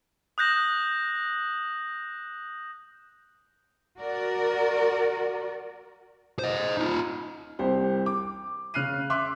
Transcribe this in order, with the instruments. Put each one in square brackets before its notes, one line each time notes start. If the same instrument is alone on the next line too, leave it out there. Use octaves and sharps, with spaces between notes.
[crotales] D#6 F#6 G6 A#6 E7 F#7
[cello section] F#4 A#4 D5
[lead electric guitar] C5 D#5
D#4 F4
[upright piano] C2 G4 C5
D6
C#3 F6 F#6 C7 D#7
E5 C6 D6 F#6